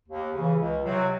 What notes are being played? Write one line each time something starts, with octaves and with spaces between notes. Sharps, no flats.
D#2
C#3
E3
C#2
C3 F#3